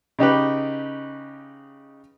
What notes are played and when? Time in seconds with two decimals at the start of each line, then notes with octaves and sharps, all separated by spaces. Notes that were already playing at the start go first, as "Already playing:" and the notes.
0.19 C#3 D#4 G4 B4